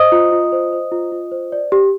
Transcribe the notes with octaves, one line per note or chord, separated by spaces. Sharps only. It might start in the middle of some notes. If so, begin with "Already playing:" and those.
Already playing: C5 D#5 D#6
F4
F4
C5
C5
F4
F4
C5
D5
G4